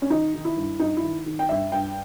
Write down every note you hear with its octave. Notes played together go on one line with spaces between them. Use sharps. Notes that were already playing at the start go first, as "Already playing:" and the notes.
C#4
D#3 D#4
D#3
E4
G2
G2 D#4
E4
D#3
D#3
G5
G2 E5
G2 G5